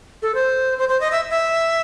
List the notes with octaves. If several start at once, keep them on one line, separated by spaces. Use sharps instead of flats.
A4
C5
C5
C5
D#5
E5
E5